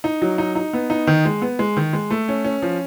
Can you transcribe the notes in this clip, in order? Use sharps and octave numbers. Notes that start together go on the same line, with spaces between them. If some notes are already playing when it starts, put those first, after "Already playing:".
D#4
F#3
D#4
D#4
B3
D#4
D#3
G#3
B3
G#3
D#3
G#3
A3
C#4
C#4
F3